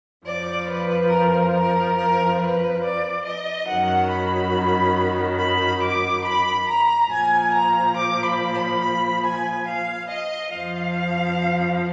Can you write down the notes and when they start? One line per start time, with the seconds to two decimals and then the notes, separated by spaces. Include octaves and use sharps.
0.25 F2 F3 D5
0.68 B4
1.10 A#4
1.54 A#4
1.96 A#4
2.40 B4
2.82 D5
3.24 D#5
3.67 F#2 D#3 F#3 F#5
4.11 B5
5.38 B5
5.82 D6
6.25 B5
6.68 A#5
7.10 A#2 F3 G#5
7.53 A#5
7.96 D6
8.24 B5
8.52 B5
8.81 B5
9.24 G#5
9.66 F5
10.09 D#5
10.52 F2 F3 F5